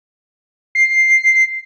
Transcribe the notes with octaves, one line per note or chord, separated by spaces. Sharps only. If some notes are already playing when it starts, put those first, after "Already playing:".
C7